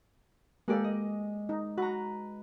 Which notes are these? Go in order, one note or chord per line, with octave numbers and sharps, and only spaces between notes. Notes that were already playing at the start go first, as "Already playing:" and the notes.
G#3 A#3 G4 A4 D5
D#5
D#4
F#4 B4 A#5